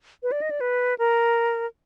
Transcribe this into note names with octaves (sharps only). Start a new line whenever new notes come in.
B4
D5
D#5
D5
B4
A#4